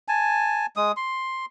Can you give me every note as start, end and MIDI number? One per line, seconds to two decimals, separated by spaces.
0.08 0.66 80
0.08 0.66 81
0.76 0.92 56
0.76 0.92 87
0.97 1.46 84